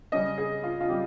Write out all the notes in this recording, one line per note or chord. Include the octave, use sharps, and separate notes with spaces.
C#3 G3 C#4 D#5
G#4
F4
F4
C#3 G3 G4